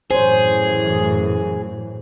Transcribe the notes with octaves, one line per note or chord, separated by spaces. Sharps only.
F#2 A2 E3 G#4 C5 C#5